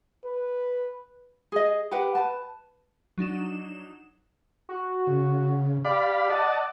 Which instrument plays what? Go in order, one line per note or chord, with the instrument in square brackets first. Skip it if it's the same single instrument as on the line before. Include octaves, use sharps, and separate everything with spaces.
[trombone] B4
[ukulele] G#4 D#5
G4 A#4 B4 F#5
B4 A5
[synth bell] F#3 D4 D#4 E7
[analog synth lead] F#4
[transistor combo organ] C#3
[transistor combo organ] G4 F5 B5 [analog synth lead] D5
[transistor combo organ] D#5 F#5 A5